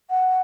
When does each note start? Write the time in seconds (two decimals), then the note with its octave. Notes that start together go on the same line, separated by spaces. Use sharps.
0.10 F#5